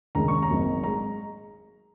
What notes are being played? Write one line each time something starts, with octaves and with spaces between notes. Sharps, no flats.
D#2 C#3 G#3 A#5
C#6
A#5
G#1 G#2 F#3 A#3
G#3 A#5